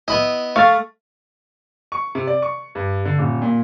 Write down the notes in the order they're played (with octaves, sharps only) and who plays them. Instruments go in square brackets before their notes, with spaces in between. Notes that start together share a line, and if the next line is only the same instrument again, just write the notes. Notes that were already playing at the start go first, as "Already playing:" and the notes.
[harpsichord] B3 B4 D#5 [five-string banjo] E4
[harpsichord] A3 [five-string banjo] F5 [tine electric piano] C#6 F6 A6
[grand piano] C#6
C3
D5
C#6
G2
D3
D#1
A#2